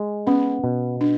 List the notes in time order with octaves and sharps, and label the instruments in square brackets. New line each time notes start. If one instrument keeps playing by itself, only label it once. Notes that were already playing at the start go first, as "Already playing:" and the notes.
Already playing: [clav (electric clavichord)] G#3
[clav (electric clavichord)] B3 [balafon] C#4
[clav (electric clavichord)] B2
[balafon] D4